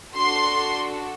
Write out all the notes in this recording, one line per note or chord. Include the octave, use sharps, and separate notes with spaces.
D4 F#4 A4 C6